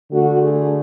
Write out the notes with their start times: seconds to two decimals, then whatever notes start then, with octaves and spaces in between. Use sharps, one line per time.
0.11 D3 A3 F#4
0.41 G#4